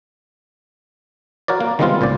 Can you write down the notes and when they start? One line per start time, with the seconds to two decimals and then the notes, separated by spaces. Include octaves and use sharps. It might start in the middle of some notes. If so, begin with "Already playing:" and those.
1.48 F#4 A#4 C#5 D5
1.60 A#3
1.79 D#3 G3 G#3 B3 C4 F4
2.01 C#2 A#2 C5 D5